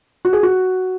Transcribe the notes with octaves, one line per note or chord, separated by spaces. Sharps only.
F#4
G#4
F#4